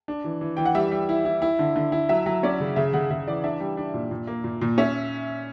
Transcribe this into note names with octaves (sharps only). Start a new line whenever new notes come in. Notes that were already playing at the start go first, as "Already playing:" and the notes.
D4
E3
E3
E3 G5
F#5
G3 E5
G3
E4
E4
E4
D3
D3
E4
F#3 E5
F#3
C#4 D5
C#3
C#3 E5
C#3 F#5
C#3 E5
E3 D5
D4 E5
G3
D4
A#2
A#2
A#3
A#2
A#2
C#4 E5